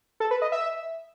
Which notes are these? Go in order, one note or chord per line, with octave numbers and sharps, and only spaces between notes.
A4
B4
D#5
E5